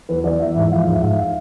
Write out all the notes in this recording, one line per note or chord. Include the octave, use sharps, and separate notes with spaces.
E2 B4
E2 D5
E2 E5
G#2 E5
F3 F5
G#2
E5
G#2 F5
F5